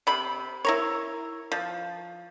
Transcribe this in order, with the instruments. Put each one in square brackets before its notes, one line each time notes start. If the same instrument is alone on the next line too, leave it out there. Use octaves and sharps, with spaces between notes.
[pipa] C3 B5
E4 A#4 C#5
F3